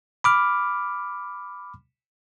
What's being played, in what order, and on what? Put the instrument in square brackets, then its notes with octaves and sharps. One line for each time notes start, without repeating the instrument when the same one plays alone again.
[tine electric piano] B5 D6 F6